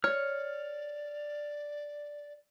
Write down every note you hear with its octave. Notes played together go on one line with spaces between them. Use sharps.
C#5 D5 F6